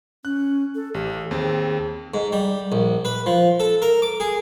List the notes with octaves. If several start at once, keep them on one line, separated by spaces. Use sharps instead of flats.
C#4 F#6
A4
A1 G4
D#2 C4 G#4
G#2
G3
A#1
B4
F3
A4
A#4
D6
G#4